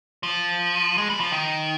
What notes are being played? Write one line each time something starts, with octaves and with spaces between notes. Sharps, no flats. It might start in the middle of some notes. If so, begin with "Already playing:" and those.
F3
G#3
G3
F3
D#3